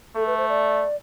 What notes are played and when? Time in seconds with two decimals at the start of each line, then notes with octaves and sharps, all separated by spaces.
0.16 A3 A4
0.27 B4
0.38 C5
0.49 D5